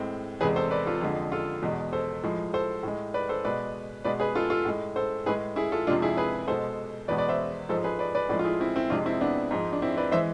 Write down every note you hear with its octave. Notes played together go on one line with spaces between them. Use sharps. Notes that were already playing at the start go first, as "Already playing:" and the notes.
Already playing: A2 G#3 C4
E2 C3 G#3 G#4 B4
A4 C5
B4 D5
F4 A4
F2 D3 F3 G#3
F4 A4
E2 B2 G#3
A4 C5
A2 F3 G#3
A4 C5
A2 G#3
B4 D5
A4 C5
B2 G#3 B4 D5
B2 G#3 B4 D5
G#4 B4
F4 A4
F4 A4
A2 G#3
A4 C5
A2 G#3 G#4 B4
E4 G#4
F4 A4
F2 C3 F3 G#3 D4 F4
E4 G#4
G#4 B4
B2 G#3 A4 C5
E2 B2 G#3 B4 D5
B4 D5
C5 E5
G#2 F3 G#3 A4 C5
G#4 B4
B4 D5
B4 D5
A2 F3 G#3 B4 D5
F4
E4 G#4
C4 E4
C4 E4
F2 C3 G#3 D4 F4
C4 E4
B3 D4
G#2 F3 G#3
D4
C4 E4
B4 D5
E3 G#3 C5 E5